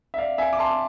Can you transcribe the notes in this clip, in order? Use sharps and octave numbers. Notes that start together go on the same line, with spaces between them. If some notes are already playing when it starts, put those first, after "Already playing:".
E5
D5 F5
E5 G#5
D6
A5 C6